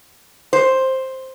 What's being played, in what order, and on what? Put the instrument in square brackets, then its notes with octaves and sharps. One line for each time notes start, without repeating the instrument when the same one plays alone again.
[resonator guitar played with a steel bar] C5